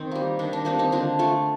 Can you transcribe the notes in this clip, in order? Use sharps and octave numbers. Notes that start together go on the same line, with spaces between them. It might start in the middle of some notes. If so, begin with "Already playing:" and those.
Already playing: D#3 C4
G3 A#3
D#3 D4
D4
G3 A#3 C4 D#4
C4 D#4
D3 D4 F4
A3 F4 A4